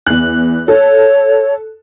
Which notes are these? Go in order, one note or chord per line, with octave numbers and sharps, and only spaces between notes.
E2 F#6
A4 C#5